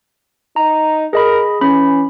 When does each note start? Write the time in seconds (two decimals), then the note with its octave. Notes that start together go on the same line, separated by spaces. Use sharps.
0.56 D#4 A#5
1.13 G#4 A#4 D#5 B5
1.61 E3 C#4 B5